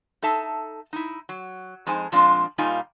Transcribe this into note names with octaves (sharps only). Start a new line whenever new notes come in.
D#4 A4 E5 A5
D#4 E4
F#3
F2 G#3 D#4 C5 G#5
A#2 F3 G#3 C4 D4 F4
A#2 G3 A#3 D#4 F4 G#5